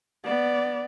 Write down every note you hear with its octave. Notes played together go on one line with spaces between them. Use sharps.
B3 D5